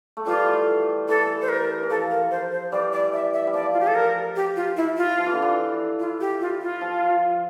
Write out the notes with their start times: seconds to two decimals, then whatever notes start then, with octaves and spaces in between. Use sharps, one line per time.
0.17 A3
0.26 E3 G3 F4
1.09 E3 A4
1.42 C5
1.49 A#4
1.83 E3
1.90 F3 A4
2.11 A#4
2.31 C5
2.52 C5
2.72 E3 G3 D5
2.92 D5
3.13 E5
3.33 E5
3.47 G3
3.54 F3 D5
3.73 F4
3.80 G4
3.87 A4
3.95 A#4
4.36 G4
4.56 F4
4.77 E4
4.97 F4
5.18 F3
5.26 E3
5.33 D3
5.42 E3
5.99 F4
6.21 G4
6.41 F4
6.61 F4
6.81 F3